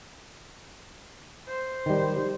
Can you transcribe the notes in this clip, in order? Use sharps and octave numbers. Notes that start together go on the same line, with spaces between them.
C5
D#3 G3